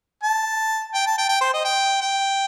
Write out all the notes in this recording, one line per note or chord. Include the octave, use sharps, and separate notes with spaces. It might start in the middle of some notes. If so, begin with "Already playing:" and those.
A5
G5
A5
G5
G5
C5
D#5
G5
G5